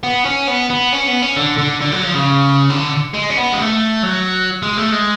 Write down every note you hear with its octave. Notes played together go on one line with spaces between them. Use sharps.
B3
C#4
B3
B3
C#4
B3
C#4
D3
D3
D3
F#3
F3
C#3
D3
G#3
C#4
B3
G#3
A3
F#3
G#3
A3
G#3